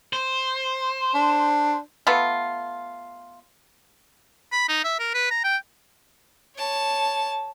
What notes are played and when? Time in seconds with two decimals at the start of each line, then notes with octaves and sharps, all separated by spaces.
0.13 C5
1.15 D4
2.07 A3 B3 F4
4.52 B5
4.69 D#4
4.84 E5
4.99 A#4
5.14 B4
5.31 A#5
5.44 G5
6.56 C#5 A5